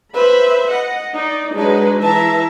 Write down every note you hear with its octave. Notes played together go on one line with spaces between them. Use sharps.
B4 C5 E5 B5
D#5 F#5
D#4 D5
F#3 G#3 D4 D#4 B4
E3 E5 A5 A#5